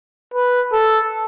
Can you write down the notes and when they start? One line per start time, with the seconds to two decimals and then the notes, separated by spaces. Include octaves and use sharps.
0.34 B4
0.72 A4